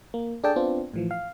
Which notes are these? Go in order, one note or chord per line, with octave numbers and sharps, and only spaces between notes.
A#3
D4 G#4 A4 D5 G5 A5
B3 C4 D4 F4
A2 E3 F3
F5